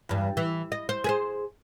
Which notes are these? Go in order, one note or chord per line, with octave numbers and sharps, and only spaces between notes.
E2 G2
E3
D#5
C5
G#4 B4 C5